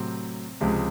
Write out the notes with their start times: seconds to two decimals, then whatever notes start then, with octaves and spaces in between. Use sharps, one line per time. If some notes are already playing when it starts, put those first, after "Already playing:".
Already playing: A2 C3 F#3 C4
0.61 C#2 C3 F3 G#3